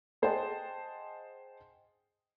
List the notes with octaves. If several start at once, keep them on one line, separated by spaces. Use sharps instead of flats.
G#4 C5 D#5 F#5 G5 A5